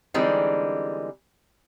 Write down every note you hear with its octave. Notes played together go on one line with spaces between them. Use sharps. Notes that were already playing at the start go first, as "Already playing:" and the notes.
D3 E3 G3 G#3 C4 D#4